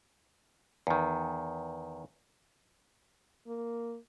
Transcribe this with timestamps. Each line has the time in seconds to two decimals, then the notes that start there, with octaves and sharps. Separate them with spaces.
0.87 E2 D#3
3.47 A#3